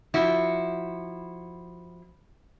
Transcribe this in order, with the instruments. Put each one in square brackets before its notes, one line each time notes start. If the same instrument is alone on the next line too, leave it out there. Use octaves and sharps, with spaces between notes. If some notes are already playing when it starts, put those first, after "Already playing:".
[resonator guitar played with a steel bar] F3 E4 F#4